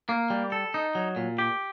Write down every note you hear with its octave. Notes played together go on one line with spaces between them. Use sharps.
A#3
G3
A4
D#4
F#3
A#2
G4